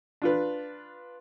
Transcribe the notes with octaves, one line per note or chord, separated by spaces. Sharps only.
D4 F4 B4